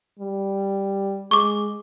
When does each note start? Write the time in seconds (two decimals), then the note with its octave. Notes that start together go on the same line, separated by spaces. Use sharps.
0.19 G3
1.31 G#3 C#6 D6